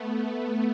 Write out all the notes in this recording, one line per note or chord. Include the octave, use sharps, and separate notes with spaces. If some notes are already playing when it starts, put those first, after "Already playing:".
Already playing: A3 B3